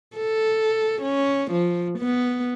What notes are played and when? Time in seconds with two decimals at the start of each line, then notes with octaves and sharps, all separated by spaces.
0.17 A4
1.02 C#4
1.51 F3
1.99 B3